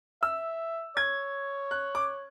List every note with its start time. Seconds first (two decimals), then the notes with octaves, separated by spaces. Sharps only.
0.22 E5 E6
0.96 C#5 G#6
1.71 F#6
1.95 D6